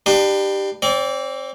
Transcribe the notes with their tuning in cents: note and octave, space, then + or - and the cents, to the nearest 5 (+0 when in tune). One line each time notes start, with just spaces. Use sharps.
D4 +30 G4 +0 B4 +0
C4 +20 D5 -30